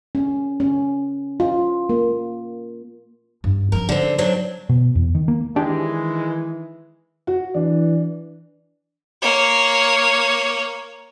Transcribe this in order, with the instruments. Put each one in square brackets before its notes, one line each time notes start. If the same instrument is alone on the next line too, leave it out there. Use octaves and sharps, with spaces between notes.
[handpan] C#4
C#4
F4
A#3
[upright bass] G2
[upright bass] F3 C#4 [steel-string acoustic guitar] A#4
[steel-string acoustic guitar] D3 C4
F#3 C4 D4
[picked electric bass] B2
E2
D#3
A#3
[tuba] D#3 [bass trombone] E3 [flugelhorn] G#3 [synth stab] D4 G4
[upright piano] F#4
[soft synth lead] E3 [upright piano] D4
[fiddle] A#3 C#5